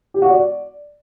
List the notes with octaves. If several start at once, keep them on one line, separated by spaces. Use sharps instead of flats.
G4
F#4
D5